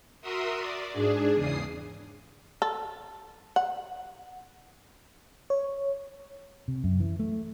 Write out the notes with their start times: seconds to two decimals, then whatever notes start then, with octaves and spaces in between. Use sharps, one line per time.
0.21 F#4 A#4 E5 C6 D#6
0.57 D5
0.92 G#2 D4 G#4
1.35 E2 C#3 D#6 C7
2.62 A4
3.56 F#5
5.50 C#5
6.68 C3
6.84 F#2
7.00 E3
7.20 A3